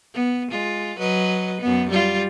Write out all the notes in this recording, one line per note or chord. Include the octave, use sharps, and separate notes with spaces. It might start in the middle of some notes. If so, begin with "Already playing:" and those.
B3
G#3 F4
F#3 B4 D#5
F#2 B3
G3 F4